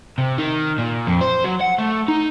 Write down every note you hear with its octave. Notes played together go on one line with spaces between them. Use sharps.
C3
D#3
A#2
F2
C5
F#3
F#5
A3
D#4